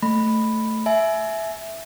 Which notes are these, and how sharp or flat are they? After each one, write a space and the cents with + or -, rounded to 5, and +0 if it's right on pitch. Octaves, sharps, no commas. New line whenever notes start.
A3 +10 B5 +0
E5 +0 G#5 +35